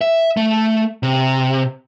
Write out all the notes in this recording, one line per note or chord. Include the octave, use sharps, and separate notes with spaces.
E5
A3
C3